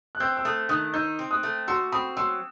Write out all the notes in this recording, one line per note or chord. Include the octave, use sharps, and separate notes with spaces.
F#6
C4 E6 G6
E6
A3 D#6 F#6
D#3 D#6 F#6
D#4 E6 G6
C4
D#6 F#6
A3
F#4 C6 E6
C4 B5 D#6
F#3 C6 E6